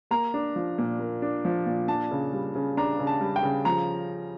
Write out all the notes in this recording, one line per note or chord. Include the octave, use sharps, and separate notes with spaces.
A#3 A#5
D4
F3
A#2
A#3
D4
F3
A#2
D4 A5
C#3
G3
C#3
D4 A#5
C#3
A5
G3
G5
C#3
F3 A#5